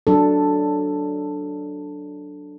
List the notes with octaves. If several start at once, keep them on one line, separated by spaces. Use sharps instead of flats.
F#3 D4 A4